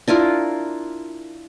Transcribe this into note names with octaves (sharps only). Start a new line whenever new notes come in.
D4 E4 F4 A#4